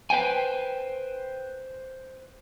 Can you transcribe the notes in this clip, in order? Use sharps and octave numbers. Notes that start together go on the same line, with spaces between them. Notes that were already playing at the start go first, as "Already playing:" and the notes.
B4 C5 G5 G#5